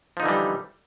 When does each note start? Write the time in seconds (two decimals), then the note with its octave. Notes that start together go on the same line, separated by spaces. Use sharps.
0.17 F3
0.20 D#4
0.23 D3
0.26 E3
0.29 G3